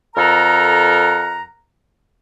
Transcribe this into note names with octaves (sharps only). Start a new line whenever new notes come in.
F2 A4 A#4 F#5 A#5